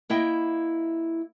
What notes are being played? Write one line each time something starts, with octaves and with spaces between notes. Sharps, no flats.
A#3 E4 D#5 G5